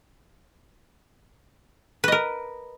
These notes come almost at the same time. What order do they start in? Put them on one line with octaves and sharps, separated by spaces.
B4 D#5 A#4